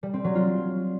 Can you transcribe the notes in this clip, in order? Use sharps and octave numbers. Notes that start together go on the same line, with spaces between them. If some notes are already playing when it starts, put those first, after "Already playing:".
G3
C4
F#3
F4